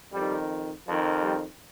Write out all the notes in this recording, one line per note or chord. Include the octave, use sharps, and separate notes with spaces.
F2 D#3 G3
F2 D#3 F3
G3